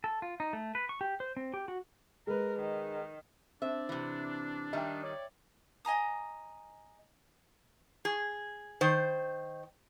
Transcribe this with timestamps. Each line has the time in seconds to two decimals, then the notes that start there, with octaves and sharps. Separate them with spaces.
0.04 A4
0.22 F4
0.40 D#4
0.53 A3
0.75 B4
0.89 C#6
1.01 G4
1.20 C5
1.37 C4
1.54 G4
1.68 F#4
2.27 G#3 A#4 B4
2.59 D#3
3.62 C4 D4 E5
3.89 C3 E3
4.73 D#3 G3 D#4 E5 G5
5.03 C#5 D5
5.85 D#5 G#5 A#5 D#6
8.05 G#4
8.81 D#3 C5